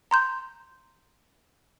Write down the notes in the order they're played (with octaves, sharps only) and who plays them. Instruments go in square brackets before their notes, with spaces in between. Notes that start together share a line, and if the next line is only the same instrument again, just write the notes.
[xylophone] A#5 C6 G6